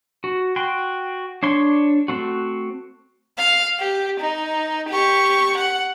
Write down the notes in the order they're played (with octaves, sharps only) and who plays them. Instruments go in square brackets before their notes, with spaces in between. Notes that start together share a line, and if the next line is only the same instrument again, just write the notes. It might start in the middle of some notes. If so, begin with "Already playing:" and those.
[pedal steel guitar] F#4
F#4 G5 C6
D4 C#5 C6
A3 C4 F#4
[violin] F5
G4
D#4
G4 C#6
F#5